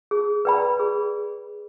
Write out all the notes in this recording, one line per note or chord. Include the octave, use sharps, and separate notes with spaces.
G#4
B4 D5 G5 B5
G#4